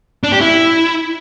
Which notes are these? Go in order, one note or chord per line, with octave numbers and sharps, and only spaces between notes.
D4
G4
E4